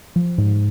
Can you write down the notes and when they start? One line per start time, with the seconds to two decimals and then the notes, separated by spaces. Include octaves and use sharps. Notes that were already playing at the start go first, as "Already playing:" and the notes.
0.16 F3
0.38 G#2